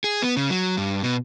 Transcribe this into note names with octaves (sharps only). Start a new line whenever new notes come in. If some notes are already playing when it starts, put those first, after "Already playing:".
G#4
B3
C#3
F#3
G2
B2